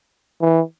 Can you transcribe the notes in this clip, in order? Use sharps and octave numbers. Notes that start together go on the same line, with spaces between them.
E3